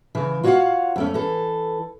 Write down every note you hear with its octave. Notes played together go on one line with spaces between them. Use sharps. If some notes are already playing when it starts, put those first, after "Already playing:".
C#3 E3
F4 F#4 C#5 D5 F5 F#5
F2 A3 C#4
E3 A4